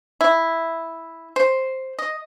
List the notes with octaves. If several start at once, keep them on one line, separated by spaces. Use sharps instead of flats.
E4
C5
D#5